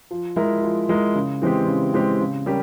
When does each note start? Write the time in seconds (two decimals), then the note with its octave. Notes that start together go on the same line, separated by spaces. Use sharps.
0.11 F3
0.36 G#3 E4 A#4
0.63 F3
0.89 G#3 E4 A#4
1.15 C#3
1.42 E3 G#3 C4 G4
1.68 C#3
1.94 E3 G#3 C4 G4
2.20 C#3
2.46 G3 C#4 G4 A#4